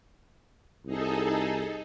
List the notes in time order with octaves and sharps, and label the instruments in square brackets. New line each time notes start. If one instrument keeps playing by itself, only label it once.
[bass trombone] C2 [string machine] D#4 G#4 A4